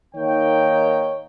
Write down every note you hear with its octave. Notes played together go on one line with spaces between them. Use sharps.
D#3 A#3 D#4 C#5 G5